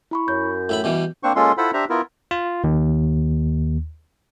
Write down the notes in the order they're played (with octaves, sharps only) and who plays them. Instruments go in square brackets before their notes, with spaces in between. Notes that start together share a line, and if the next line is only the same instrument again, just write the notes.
[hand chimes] E4 B5 C#6
[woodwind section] F#2 [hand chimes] G6
[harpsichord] A2 E5 B5
B2 E3 G3
[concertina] A#3 C4 D4 C5 C#6
G#3 A#3 C#4 F4 A4 C6
E4 F4 A4 C5 F#5 B5
D4 G4 C5 E5 A#5
B3 E4 F4 A#4
[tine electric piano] F4
D#2